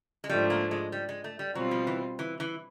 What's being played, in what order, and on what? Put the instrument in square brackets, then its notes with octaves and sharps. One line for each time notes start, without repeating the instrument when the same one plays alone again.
[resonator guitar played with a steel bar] G#3
[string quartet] G#2 F3 A3 D4 [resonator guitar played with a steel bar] G3
[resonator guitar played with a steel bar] A#3
G#3
G3
G#3
A3
G3
[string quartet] B2 G3 C4 F4 [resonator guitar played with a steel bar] F#3
[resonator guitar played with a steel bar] F3
E3
E3
E3